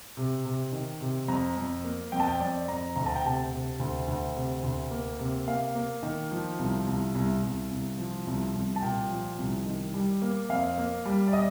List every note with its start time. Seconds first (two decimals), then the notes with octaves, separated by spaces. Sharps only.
0.17 C3
0.45 C3
0.72 D#3
1.01 C3
1.28 F2 A#5
1.57 F2
1.84 A#3
2.12 F2 G5
2.20 A5
2.27 G5
2.40 F2 D5
2.68 F2 A#5
2.96 D2 A#5
3.06 A5
3.16 G5
3.24 C3 A5
3.52 C3
3.80 D2
4.08 D2
4.35 C3
4.63 D2
4.91 A#3
5.19 C3
5.48 A#3 F5
5.75 A#3
6.03 D#3
6.31 F3
6.59 C2
6.87 C2
7.15 C2
7.43 C2
7.71 C2
7.98 F3
8.26 C2
8.55 C2
8.76 A5
8.82 A#2 G5
9.10 F3
9.38 C2
9.66 D#3
9.94 G3
10.22 A#3
10.49 F2 F5
10.78 A#3
11.05 G3
11.28 D5
11.33 D#5